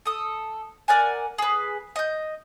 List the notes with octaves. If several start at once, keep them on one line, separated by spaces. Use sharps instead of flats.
A4 D#6
A#4 D5 F#5 G#5
G#4 B4
D#5 G6